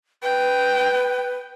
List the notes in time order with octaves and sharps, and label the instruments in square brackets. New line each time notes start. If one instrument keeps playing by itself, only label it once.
[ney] B4 [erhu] G5